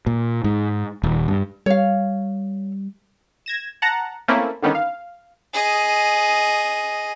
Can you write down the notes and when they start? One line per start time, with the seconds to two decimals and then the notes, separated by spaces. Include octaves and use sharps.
0.07 A#2
0.44 G#2
1.03 D#1
1.28 G2
1.66 G3 C#5 F5
3.46 G#6 A#6 E7
3.82 F#5 A5 A#5 A#6
4.28 A3 A#3 C4 C#4 E4
4.63 D3 D#3 G3 B3 C#4 D#4
4.75 F5
5.54 G#4 D#5